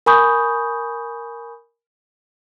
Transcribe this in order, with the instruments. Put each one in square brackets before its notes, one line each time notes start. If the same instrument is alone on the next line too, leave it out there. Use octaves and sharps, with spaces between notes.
[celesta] A#4 G#5 B5 C#6 D#6 G6